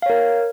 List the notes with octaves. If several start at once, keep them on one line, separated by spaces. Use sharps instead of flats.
A#4 C#5 F5